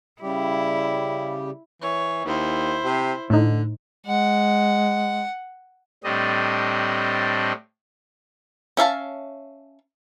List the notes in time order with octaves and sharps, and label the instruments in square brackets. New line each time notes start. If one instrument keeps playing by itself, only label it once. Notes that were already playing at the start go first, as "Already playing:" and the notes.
[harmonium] C#3 G3 G4 [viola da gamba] E4
[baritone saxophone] E3 [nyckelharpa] C#5
[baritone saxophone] D#2 [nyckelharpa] E4 C5
[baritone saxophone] C3
[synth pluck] A2 D#4 [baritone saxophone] D3
[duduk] G#3 [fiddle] F#5
[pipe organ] A2 G3 C4 D4 D#5
[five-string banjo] C#4 E5 F5 A5